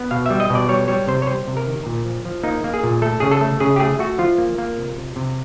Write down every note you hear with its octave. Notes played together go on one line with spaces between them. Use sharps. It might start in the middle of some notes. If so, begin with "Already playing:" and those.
Already playing: B3
B2 F5
G3 E5
D#5
B2 D5
G3 C#5
G3 C#5
C3 C5
C#5
G3 C5
C3
A#4
D#3
A#2
F3
F3
A#3 D#4
A#3
G#4
A#2
A3 A4
C#3 G#4
A4
A3
C#3 G#4
G4
A3 G#4
A3 F#4
F3 F4
A#3
A#3
C3
C3
C3